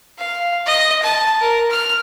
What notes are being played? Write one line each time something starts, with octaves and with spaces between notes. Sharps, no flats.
F5
D#5
A5
A#4
F6